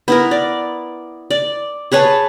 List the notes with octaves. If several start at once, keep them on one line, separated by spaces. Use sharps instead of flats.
B3 E4 A#4
D5
D5
G#4 B4 C#5 A5